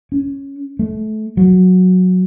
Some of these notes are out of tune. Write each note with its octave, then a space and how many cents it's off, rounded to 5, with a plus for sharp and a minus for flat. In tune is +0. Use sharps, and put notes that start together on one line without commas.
C#4 +0
A3 -25
F#3 -10